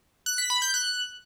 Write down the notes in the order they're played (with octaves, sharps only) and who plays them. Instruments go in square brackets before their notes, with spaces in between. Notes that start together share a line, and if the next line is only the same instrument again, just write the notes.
[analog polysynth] F#6
B6
B5
G6
F#6